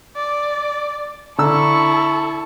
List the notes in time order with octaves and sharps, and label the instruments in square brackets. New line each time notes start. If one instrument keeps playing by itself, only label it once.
[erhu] D5
[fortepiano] D3 A#5 E6 [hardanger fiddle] E4 C#6 [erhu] A4